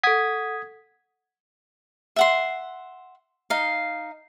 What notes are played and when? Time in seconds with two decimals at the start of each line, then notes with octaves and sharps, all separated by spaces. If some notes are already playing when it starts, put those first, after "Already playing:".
0.03 A4 F#5 D#6 G#6 B6
2.16 E5 F#5 C6
3.50 D#4 F5